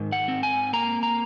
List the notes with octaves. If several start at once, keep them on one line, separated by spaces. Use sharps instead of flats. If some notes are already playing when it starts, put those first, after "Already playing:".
Already playing: G#2 D#3
F#5
C4
G#5
A#3 A#5
A#5